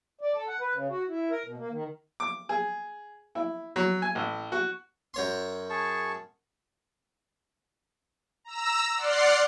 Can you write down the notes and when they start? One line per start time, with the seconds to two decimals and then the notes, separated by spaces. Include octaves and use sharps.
0.21 D5
0.34 A4
0.48 F#5
0.61 B4
0.74 C#3
0.89 F#4
1.08 E4
1.31 A#4
1.45 B2
1.57 A#3
1.71 D#3
2.20 D6
2.49 G#4
3.35 E4
3.76 F#3
4.02 G#5
4.15 A1
4.52 F#4
5.14 F#2 C#5 C6
5.70 G#4 A5 C#6
8.44 A#5 E6
8.97 D5 F#5 C6 F6 C7